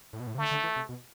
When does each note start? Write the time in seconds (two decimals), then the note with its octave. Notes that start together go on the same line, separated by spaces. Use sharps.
0.13 A2
0.20 B2
0.27 A2
0.35 C3
0.38 D3 A3
0.51 D3
0.64 E3
0.76 C3
0.89 B2